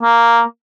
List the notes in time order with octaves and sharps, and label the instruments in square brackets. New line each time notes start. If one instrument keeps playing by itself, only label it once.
[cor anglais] A#3